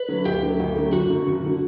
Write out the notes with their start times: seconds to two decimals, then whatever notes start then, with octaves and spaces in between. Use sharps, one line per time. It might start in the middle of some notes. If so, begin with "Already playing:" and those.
Already playing: B4
0.08 D3 F#3 A3
0.25 D2 G4
0.43 D3 F#3 A3
0.60 D2
0.76 D3 F#3 A3
0.93 F#1 F#4
1.10 F#2 D3
1.27 F#1
1.46 D3